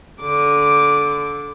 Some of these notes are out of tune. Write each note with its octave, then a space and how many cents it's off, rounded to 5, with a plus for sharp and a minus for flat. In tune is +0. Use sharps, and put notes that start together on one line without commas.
D3 -20 D6 +0